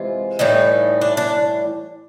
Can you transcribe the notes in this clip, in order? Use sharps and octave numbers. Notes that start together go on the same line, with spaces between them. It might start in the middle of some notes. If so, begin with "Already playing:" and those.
Already playing: C3 E3 G#3 F4
A2 E3 G3 D#4
D4
D4